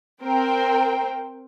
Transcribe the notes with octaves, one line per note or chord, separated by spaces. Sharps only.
C4 A#4 C5 G5